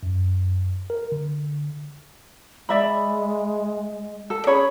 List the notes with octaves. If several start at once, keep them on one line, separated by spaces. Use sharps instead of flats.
F#2
A#4
D3
G#3 D5 E5 B5
A4
C#4 G#4 C#5 B5